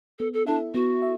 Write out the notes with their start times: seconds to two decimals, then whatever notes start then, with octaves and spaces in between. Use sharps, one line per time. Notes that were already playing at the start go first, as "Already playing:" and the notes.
0.19 B3 A4
0.33 A4
0.47 D4 E4 A4 E5
0.74 B3 F#4
1.02 E5